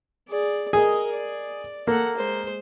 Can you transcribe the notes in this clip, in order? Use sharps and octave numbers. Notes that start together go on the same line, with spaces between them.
G#4 D5
G#4 A#4 D#5
D5
A#3 A4 F#5
G#3 C5